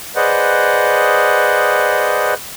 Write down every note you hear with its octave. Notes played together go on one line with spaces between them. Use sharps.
G#4 B4 C5 D5 D#5 F#5